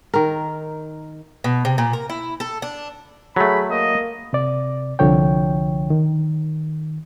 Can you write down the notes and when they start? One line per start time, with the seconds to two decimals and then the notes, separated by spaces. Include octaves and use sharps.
0.14 D#3 A#4
1.44 B2
1.65 C3
1.78 A#2
1.93 A#4
2.10 E4
2.40 A4
2.62 D4
3.36 F#3 A3 G#4 B5
3.71 A#3 D#5
4.33 C3 D5
4.99 C2 D3 F3 C#5 G5
5.90 D#3